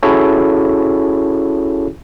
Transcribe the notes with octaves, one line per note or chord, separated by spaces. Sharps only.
C#4 E4 F#4 G#4 A4 C#5